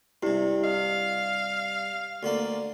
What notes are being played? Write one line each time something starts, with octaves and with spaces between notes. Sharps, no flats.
G2 C3 E4 G4
D#5 F5
D2 D3 A#3